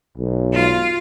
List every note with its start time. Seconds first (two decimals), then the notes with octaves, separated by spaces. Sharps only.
0.17 B1
0.53 F4